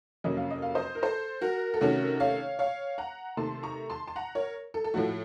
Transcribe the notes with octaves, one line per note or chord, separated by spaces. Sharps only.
F2 C3 F#3 A#3 C#4 D#5
F5
D#5
F5
C5 D#5
A#4
A4 C5
F#4 A#4
A4
C3 D#3 A3 C#4 F#4 A#4
C#5 F5
C#5 F5
F#5 A#5
C3 D#3 A3 A5 C6
A#5 C#6
A5 C6
A5
F#5 A#5
A#4 C#5
A4
A4
A2 F3 A3 F#4